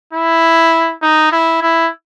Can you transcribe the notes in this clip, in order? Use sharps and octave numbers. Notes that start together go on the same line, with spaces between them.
E4
D#4
E4
E4